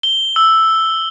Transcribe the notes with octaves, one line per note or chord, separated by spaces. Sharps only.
G7
E6